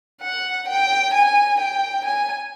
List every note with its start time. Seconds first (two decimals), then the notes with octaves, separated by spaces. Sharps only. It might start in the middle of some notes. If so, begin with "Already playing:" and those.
0.22 F#5
0.68 G5
1.13 G#5
1.60 G5
2.05 G#5